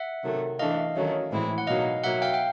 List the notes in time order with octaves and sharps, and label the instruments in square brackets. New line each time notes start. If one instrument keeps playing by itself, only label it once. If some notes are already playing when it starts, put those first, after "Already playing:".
Already playing: [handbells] E5 F#5
[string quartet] C3 D#3 F#3 A3
[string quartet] E3 A3 D4 [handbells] D#5 F5
[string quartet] D#3 F#3 A3 C#4
A2 E3 G#3 C4 E4
[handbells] F#5
[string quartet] B2 F#3 A#3 D#4 [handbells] D#5 F5
[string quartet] B2 F#3 A#3 [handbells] E5 F#5
[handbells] F5 G5
G5